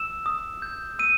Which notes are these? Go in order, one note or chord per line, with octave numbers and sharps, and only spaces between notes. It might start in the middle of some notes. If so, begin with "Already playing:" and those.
Already playing: E6 E7
D#6
G6
E6 D#7